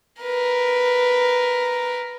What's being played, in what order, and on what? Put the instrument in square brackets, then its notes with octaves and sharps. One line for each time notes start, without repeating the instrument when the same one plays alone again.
[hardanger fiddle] A#4 B4